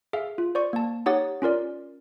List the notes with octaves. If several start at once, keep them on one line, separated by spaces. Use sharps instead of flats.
G#4 E5 F5
F4
C5 D5 C#6
A#3 A5
D#4 G4 C#5 F#5 D#6 A6
C#4 F4 A#4 D5